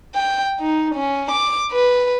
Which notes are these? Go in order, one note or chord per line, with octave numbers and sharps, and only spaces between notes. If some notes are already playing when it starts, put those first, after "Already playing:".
G5
D#4
C#4
D6
B4